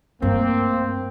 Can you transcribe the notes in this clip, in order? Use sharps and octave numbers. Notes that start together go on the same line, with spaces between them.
G2 A3 A#3 C4